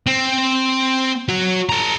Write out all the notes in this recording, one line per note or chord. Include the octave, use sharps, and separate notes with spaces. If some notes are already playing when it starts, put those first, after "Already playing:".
C4
F#4 C#5
A4 A#5